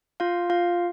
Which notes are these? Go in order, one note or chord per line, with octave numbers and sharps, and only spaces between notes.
F4 F5
F4 F5